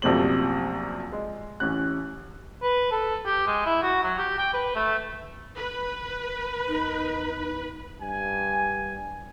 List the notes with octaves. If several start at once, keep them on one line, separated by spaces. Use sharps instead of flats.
A#1 F#2 C3 A3 C5 F#7
G#3
A1 C#4 F#6
B4
A4
G4
G#3
E4
F#4
F#3
G4
G5
B4
A3
G1
B4
E2 D#4
G2 G#5